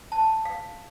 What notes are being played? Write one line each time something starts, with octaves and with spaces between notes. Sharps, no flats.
A5
F5